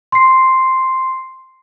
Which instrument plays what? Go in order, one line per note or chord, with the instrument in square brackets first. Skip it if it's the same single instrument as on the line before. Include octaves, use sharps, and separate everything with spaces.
[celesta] C6 C7